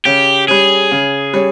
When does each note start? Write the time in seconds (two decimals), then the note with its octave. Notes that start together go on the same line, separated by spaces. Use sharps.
0.05 C#3 G4
0.48 G3 C#4 G#4
0.91 C#3
1.33 G3 C#4